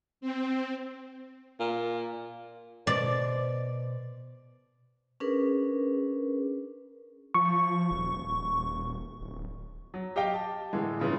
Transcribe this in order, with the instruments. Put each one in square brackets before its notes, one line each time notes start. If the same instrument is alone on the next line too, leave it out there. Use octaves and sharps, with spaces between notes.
[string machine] C4
[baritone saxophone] A#2
[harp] B2 [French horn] C5 [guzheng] D5
[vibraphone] C#4 D4 G#4 A#4 B4
[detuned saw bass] F3 [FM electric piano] C#6
[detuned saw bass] D#1
D1
[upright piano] F#3
G4 D#5 F5 G5
A5
A2 D3 E3 G#3
G2 C#3 E3 F4